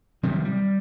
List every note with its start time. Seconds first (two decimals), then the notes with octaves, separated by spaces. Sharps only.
0.23 C3 D#3 F#3 G3
0.45 G3